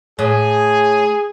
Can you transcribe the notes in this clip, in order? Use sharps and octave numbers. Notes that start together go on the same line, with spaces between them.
A2 G#4